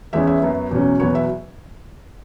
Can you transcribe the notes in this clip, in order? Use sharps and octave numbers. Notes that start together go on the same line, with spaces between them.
E2 E3 G#3 C#4 E5
E5
F#2 F#3 B3
E2 B2 F#3 C#4
E2 B2 F#3 B3 C#5
E5